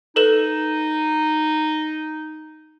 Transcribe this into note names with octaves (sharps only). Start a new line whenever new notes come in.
D#4 A4 B4 E7